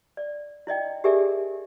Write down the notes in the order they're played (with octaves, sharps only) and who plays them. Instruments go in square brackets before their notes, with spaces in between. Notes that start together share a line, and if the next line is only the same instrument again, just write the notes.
[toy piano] D5
E4 D5 D#5 G5
G4 G#4 A#4 D5 E5 G#5